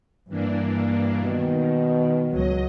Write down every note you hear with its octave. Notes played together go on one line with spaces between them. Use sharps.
G2 E3 A#3 D4
B2 D#3
C#2 F#3 D#5